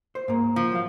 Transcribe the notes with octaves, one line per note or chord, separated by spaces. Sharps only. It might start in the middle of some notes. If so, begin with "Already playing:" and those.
C5
G#2 A#3
F3
F#3 F5